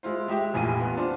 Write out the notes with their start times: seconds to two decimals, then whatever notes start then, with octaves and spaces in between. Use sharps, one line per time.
0.03 G#3 E4 F4 C5
0.28 G#3 G4 E5 G5
0.54 F1 A#1 E3 F5 D#7
0.80 B3 F4
0.97 C4 D4 F4